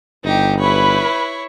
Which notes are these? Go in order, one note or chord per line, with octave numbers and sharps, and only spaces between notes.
G1 D#4 G4
E4 B4 C#5 B5